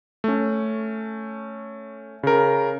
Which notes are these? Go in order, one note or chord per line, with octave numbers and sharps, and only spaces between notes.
A3 C#4
C#3 A#4